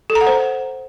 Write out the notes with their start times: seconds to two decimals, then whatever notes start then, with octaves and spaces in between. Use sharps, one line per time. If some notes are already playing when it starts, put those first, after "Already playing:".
0.10 A4
0.15 A#5
0.21 F#5
0.27 C5